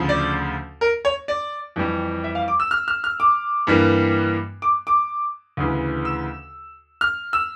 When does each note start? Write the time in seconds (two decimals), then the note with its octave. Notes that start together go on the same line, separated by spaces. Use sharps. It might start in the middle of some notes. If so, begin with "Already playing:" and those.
Already playing: D2 C#3 F3
0.09 D5
0.81 A#4
1.05 C#5
1.28 D5
1.76 F2 E3 G3
2.24 E5
2.35 F5
2.48 D6
2.60 E6
2.71 F6
2.88 F6
3.04 F6
3.20 D6
3.67 G2 E3 G3 A#3
4.62 D6
4.87 D6
5.57 D2 C#3 E3
6.05 E6
7.01 F6
7.33 E6